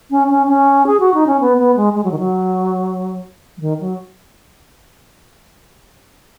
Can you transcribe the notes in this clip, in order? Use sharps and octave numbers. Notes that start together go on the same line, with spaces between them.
C#4
C#4
C#4
G#4
F#4
D#4
C#4
B3
B3
G#3
G#3
F#3
D#3
F#3
F#3
D#3
F#3